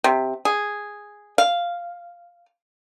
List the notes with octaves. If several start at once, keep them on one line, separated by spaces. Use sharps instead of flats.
C3
G#4
F5